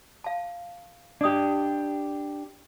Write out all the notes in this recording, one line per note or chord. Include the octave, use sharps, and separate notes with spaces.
F5 A5
D4 G4 D5 D#5 D#6